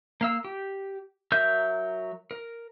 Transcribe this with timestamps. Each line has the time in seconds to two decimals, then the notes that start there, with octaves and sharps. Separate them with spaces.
0.21 A#3 F5 E6
0.44 G4
1.32 F#3 A#4 E5 G6
2.31 A#4